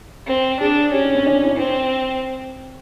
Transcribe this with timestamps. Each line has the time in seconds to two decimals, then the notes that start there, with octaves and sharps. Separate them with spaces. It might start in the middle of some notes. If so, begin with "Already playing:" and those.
0.27 C4
0.60 D4 G#4
0.92 C#4 G4
1.04 D4
1.15 C4
1.26 D4
1.43 E4
1.51 D4
1.58 C4